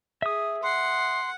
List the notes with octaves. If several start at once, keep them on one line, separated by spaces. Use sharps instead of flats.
G#4 E5 D#6
F#5 C6